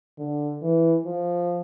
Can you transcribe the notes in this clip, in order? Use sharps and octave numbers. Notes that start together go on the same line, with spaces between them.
D3
E3
F3